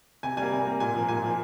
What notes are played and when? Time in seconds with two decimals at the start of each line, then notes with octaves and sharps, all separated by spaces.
0.23 C3 G#5
0.37 G3 A#3 G#5
0.52 C3
0.65 G3 A#3
0.80 A#2 G#5
0.95 F3 A#3
1.09 A#2 G#5
1.23 F3 A#3